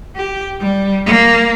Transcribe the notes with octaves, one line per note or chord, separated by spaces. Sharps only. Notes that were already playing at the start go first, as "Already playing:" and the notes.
G4
G3
A#3